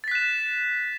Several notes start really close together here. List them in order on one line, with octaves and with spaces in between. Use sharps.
A6 B6 F#6 E7